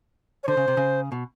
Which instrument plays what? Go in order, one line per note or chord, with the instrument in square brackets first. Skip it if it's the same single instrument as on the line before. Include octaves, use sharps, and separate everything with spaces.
[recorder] C#5
[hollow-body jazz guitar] D3 [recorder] C5
[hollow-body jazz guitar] C#3
C3
C#3
B2